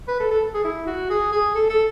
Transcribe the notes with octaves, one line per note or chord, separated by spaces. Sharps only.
B4
A4
A4
G#4
E4
F#4
G#4
G#4
A4
A4